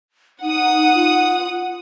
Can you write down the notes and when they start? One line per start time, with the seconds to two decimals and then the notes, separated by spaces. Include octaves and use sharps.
0.43 D#4 F#5 D#6
0.94 F4